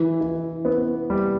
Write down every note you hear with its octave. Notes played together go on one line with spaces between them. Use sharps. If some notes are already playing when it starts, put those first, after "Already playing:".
Already playing: E3
E3
B3
G3